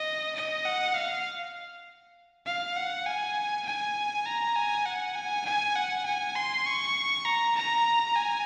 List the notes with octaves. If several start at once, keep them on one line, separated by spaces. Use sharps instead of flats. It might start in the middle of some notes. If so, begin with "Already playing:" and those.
Already playing: D#5
D#5
F#5
F5
F5
F#5
G#5
G#5
A#5
G#5
F#5
G#5
G#5
F#5
G#5
C6
C#6
A#5
A#5
G#5